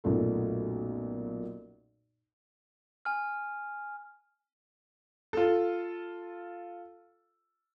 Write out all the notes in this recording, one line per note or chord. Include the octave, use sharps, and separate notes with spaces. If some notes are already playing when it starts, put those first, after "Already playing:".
B1 F#2 A#2 A3
G#5 F6
F4 A4